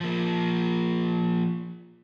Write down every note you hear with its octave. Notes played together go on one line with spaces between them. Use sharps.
F3 A#3